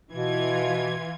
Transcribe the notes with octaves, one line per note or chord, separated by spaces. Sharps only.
B2 E3 F4 G#6